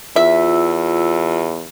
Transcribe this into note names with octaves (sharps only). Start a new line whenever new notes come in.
E2 F4 E5 E6